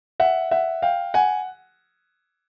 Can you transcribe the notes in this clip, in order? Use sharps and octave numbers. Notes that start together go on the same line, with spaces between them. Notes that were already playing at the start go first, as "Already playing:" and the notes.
E5 F#5
E5 F#5
F5 G5
F#5 G#5